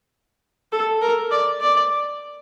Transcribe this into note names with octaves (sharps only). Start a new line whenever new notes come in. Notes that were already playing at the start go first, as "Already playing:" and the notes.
A4
A#4
D5
D5